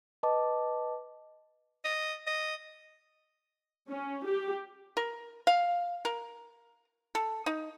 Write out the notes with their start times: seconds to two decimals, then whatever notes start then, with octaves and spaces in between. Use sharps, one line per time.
0.23 B4 D#5 A5 D6
1.84 D#5
2.27 D#5
3.90 C#4
4.26 G4
4.97 A#4
5.47 F5
6.05 A#4
7.15 A4
7.46 D#4